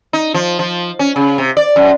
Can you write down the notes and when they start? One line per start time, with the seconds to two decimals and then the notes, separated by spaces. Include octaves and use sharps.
0.13 D#4
0.34 F3
0.59 F3
0.99 C#4
1.16 C#3
1.38 C3
1.57 D5
1.76 F#2